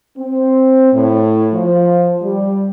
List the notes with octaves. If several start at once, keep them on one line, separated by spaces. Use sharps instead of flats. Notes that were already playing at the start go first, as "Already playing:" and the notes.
C4
A2
F3
G3